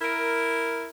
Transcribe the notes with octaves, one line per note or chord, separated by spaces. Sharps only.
E4 A#4